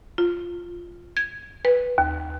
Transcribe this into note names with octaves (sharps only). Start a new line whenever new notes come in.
F4
G#6
B4
D#2